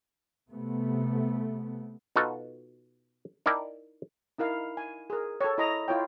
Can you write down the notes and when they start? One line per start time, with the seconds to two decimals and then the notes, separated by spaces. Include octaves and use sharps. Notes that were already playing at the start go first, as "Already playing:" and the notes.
0.52 C3 A3 B3
2.16 B2 D#4 F4 F#4 A4
3.46 D#4 E4 A#4 D5 G5 A5
4.38 D#4 E4 A#4 F5
4.77 G#5
5.10 G#4 A#4
5.41 A4 C#5
5.58 E4 A4 D#5 A#5
5.88 E4 F4 C#5 G5